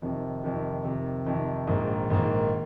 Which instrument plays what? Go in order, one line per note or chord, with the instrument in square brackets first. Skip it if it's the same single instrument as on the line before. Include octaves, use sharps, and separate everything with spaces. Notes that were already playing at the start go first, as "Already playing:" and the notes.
[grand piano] F2 C3 D#3
F2 C3 D#3
F2 C3 D#3
F2 C3 D#3
A#1 G#2 D#3 A#3
A#1 G#2 D#3 A#3